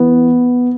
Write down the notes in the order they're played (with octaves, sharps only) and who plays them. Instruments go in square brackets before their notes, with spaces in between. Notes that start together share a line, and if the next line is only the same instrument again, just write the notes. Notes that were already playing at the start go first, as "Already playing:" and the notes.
Already playing: [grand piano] E3 B3